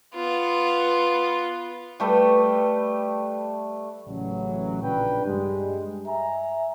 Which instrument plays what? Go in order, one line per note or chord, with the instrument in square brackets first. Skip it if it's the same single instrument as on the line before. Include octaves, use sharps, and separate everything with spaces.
[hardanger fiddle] B3 F4
[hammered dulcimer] G3 A3 B4 G5
[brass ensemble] A1 C#3 E3 F#3
A#1 C#3 D4 B4 G5
G2 G3 G#3
E5 G#5 A#5